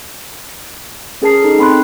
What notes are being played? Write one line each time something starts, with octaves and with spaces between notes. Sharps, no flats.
C#4 G#4 A#4 A5 C7
D#4 A4
C4 B5 C6 F#6